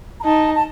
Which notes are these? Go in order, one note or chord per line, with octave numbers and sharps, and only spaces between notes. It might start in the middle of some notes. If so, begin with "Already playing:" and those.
A#5
D#4 A5
A5